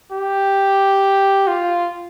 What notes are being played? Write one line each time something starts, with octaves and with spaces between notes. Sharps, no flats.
G4
F4